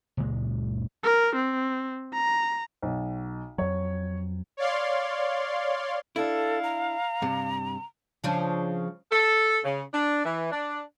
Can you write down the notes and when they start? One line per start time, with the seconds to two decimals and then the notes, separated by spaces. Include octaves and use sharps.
0.17 F#1 C#2 A#2 G#3
1.03 A#4
1.36 C4
2.13 A#5
2.82 B1
3.58 F2 F#3 C#5
4.57 C#5 D5 F5 C6
6.16 D4 E4 A4 F5
6.63 A#5
7.22 G2 C3
8.24 C#3 F3 D4
9.12 A4
9.65 C#3
9.94 D4
10.25 E3
10.52 D4